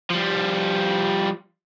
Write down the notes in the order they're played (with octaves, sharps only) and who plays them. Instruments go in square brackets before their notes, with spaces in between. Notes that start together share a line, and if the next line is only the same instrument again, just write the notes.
[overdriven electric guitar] F3 G3